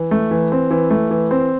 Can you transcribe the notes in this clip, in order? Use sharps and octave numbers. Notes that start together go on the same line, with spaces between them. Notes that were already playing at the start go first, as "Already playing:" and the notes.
Already playing: E3
A3
E3
C4
E3
A3
E3
C4